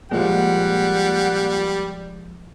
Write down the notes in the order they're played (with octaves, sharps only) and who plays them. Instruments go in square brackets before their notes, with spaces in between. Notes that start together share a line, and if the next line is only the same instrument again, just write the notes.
[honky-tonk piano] A#2 [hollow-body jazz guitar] F3 G#3 [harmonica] G3 [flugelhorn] F#5